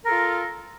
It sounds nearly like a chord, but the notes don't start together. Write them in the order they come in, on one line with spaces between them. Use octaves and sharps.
A#4 A4 F4